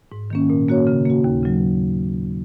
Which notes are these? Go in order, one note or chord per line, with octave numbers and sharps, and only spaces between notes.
G#2
D#3 A#3 C#4
A#2
A#3 F#4 C#5
C#3
A#3 F#4
D#2
C#3 F#3